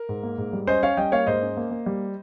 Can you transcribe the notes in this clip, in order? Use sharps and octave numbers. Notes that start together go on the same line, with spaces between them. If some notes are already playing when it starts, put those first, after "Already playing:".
Already playing: A#4
G#2
A#3
G#2
G3
C#4 C5 D#5
C#4 C#5 F5
G3 D#5 G5
A#3 C#5 F5
G#2 C5 D#5
C#4
A#3
A#3
G3